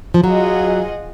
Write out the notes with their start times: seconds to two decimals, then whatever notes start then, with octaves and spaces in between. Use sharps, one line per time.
0.14 F3
0.23 F#3 F4 G#4 D#5 F#5